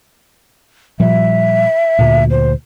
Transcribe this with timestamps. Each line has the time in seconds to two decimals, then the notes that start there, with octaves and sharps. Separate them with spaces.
1.00 A#2 F3 G3 E5
1.99 D2 A#2
2.31 C5